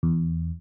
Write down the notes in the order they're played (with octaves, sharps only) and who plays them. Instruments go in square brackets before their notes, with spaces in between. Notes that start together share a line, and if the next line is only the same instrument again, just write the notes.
[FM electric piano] E2